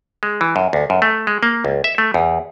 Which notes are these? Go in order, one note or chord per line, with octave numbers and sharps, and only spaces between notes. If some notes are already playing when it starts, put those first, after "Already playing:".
G#3
E3
F#2
D2
F#2
A3
G#3
A#3
C#2
E5
A3
E2